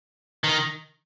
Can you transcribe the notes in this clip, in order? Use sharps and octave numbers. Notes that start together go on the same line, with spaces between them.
D#3